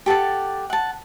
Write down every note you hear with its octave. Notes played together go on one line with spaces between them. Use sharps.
G4 A4 F#5 A5
F#5 A5